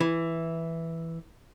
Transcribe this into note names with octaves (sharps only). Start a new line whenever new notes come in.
E3